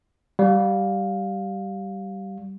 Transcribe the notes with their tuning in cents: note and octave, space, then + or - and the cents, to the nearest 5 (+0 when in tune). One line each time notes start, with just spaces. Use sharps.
G3 -15 F5 +15